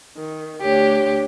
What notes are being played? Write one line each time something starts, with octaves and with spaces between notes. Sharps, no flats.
D#3
D2 D4 G4 C#5